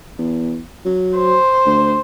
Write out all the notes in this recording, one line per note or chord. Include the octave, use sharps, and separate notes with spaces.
E2
F#3
C5
D2